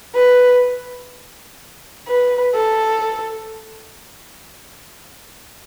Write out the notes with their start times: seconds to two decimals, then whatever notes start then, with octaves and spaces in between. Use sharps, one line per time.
0.15 B4
2.08 B4
2.55 A4